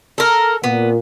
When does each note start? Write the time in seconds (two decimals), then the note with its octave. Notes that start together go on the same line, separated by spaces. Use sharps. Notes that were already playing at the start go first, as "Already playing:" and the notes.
0.18 A4 A#4
0.64 A#2 B3